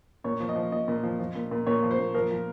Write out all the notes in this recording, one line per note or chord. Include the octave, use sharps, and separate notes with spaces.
A#2 C#5
F3
D#5
F3
A#2 D#5
A#2
F3
F3
A#2
A#2
A#2 C#5
F3
C5
A#2
F3 A#4
F3